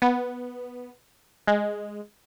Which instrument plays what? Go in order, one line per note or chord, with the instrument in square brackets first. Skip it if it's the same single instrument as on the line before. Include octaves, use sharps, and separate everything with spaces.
[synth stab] B3
G#3